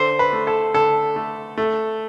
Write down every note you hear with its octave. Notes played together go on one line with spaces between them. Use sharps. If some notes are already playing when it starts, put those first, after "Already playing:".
Already playing: D3 C5
B4
A3
A4
D3 A4
A3
A3